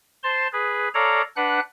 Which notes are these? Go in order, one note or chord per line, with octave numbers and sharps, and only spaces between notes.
C5 A5 C6
G#4 B4
A4 C#5 D5 F5 A#5
D4 B4 F#5 F#6